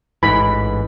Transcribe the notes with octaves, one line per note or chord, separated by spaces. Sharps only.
A1 G#2 E3 B5